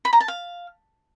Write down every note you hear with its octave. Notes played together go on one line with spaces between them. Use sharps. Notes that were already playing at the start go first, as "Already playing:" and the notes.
B5
A#5
A5
F5